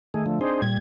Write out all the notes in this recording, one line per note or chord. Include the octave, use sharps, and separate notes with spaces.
D#3 A3 G#4
D3 F3 A3
C4 D4 D#4 G#4 C5
A#2 G3 G#6